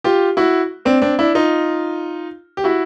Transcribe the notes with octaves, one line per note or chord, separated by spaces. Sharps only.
F4 G4
E4 F#4
C4 D4
C4 D4
D4 E4
D#4 F4
G4
E4 F#4